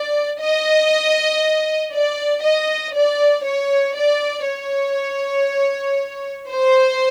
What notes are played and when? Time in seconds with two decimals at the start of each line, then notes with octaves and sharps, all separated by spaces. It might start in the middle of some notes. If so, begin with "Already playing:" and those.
Already playing: D5
0.40 D#5
1.93 D5
2.43 D#5
2.95 D5
3.45 C#5
3.96 D5
4.47 C#5
6.49 C5